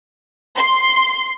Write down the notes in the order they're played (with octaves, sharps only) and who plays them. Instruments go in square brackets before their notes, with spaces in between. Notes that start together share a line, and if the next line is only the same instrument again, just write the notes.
[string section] C6